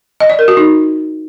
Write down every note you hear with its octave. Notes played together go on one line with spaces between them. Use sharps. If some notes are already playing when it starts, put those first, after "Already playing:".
D#5
D5
A#4
F#4
D#4